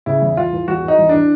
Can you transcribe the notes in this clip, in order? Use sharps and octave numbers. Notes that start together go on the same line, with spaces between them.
C#3 E4
E2
E2 F4
E3
E2 F#4
E3
D#4
E2
E3 D4